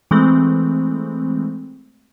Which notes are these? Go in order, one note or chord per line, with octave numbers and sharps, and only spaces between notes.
E3 G#3 A3 C4